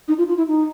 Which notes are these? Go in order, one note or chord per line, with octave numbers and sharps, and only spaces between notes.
D#4
F4
F4
E4
D#4